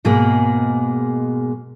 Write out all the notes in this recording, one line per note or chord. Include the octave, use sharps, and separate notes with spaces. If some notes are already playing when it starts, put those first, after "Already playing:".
G#2 B2 G#3 A#3 G#4